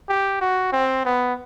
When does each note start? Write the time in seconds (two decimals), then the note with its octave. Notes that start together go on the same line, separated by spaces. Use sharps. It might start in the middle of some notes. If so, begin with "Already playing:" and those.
0.09 G4
0.41 F#4
0.72 C4
1.05 B3